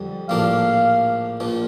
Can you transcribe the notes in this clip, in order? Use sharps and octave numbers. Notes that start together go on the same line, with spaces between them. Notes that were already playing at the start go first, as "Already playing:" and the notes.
Already playing: F2 D3 G3
A#1 A2 F3 A#3 D4 F5
A#1 A#2 F3